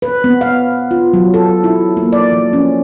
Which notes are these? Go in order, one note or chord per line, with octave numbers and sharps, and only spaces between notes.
B4
B3
F5
F4
F#3
A4
E4
A#3
D5
F3
C#4